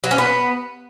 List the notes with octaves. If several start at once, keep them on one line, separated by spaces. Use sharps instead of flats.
F#3
C#4
B3